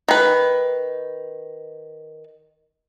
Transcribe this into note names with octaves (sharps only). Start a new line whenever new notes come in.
D#3 B4